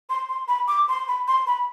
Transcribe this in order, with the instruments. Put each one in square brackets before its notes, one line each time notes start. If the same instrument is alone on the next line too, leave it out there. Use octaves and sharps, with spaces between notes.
[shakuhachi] C6
C6
B5
D6
C6
B5
C6
B5